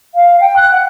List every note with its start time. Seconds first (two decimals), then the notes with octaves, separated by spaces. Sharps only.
0.16 F5
0.40 G5
0.57 F#6
0.72 F#5